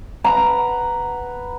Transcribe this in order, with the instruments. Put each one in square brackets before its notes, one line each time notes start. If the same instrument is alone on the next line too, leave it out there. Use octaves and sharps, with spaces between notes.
[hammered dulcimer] B4 F#5 A#5